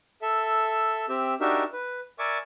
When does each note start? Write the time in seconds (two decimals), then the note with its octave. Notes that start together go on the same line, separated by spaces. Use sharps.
0.22 A4 E5
1.09 C4 G4 E5
1.40 D4 D#4 F#4 G4 A#4 E5
1.73 B4
2.19 A#4 D5 E5 G#5 C#6 D6